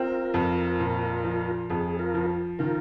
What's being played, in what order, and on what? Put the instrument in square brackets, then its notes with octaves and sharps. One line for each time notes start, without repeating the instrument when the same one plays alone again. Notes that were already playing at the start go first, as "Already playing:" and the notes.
Already playing: [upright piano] C4 [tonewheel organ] F4 A#4
[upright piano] F2
A#2
F3
[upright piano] F2 [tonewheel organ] G#4
[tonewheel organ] F4 A#4
[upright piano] F3
[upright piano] D#3 [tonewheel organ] F4 A#4